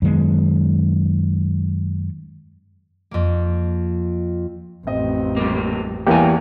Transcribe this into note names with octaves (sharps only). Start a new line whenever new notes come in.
F#2 D#3 G#3 B3
F2 A#3
A1 F2 C4 D#5
G3 A#3
E2 G2 E3 A#3 G4 G#5